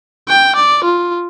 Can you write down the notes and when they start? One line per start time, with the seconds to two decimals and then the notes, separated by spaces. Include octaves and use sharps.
0.29 G5
0.56 D5
0.84 F4